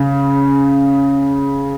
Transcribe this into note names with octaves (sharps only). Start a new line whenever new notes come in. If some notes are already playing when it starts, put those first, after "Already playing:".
Already playing: C#3